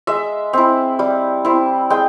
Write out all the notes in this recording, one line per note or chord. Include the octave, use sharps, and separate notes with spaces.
G#3 E5
C4 E4
G3
C4 E4
G#3 G5